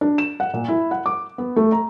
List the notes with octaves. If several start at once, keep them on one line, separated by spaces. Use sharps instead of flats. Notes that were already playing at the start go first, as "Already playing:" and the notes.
D4
E7
F#5
A#2
E4
F#5
D6
B3
A3
A#5